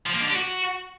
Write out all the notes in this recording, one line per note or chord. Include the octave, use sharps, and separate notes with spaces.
F3
A#3
D3
G4
F#4